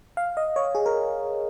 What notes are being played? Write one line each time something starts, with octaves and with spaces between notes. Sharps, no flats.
F5
D#5
C#5
G#4
A#4